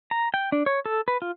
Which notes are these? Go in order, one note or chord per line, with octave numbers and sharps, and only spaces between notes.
A#5
G5
D4
C#5
A4
B4
F4